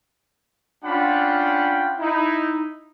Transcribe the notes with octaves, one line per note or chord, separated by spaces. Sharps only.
C#4 D4 F4 F#5 G5 B5
D#4 E4